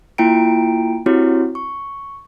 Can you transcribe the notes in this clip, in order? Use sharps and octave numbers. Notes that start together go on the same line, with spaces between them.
A#3 E4 F4 G5 A#5 D7
C4 E4 F#4 G4 C#5
C#6